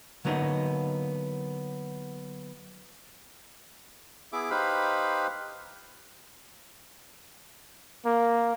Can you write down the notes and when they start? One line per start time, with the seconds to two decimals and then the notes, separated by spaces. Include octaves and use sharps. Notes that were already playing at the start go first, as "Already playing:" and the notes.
0.25 D3 F#3 A#3 B3 D4 D#4
4.33 B3 E4 G#4 E5 D6
4.50 D#4 G4 B4 C5 F5 B5
8.06 A#3